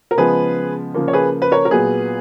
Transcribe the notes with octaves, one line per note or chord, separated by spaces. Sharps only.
A#4
C#3 F3 G#3 B3 G#4 B4
C#3 F3 A#3
C#5
G#4 B4
B4
A#4 C#5
A#4
A#2 F#3 B3 G#4 B4